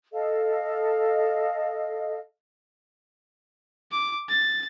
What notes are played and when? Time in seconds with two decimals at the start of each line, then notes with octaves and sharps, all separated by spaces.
0.13 A4 D#5 F5
3.92 D6
4.29 A6